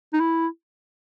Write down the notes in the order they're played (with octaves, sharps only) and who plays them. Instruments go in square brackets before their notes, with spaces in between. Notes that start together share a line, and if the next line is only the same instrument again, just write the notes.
[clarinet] D#4
E4